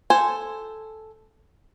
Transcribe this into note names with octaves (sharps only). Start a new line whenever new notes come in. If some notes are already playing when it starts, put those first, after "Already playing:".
A4 C5 G#5